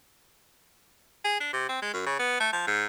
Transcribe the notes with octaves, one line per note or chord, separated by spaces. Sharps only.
G#4
D4
C3
C4
G#3
F#2
C#3
B3
A3
F3
G#2